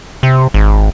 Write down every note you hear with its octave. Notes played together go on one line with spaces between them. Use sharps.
C3
G#1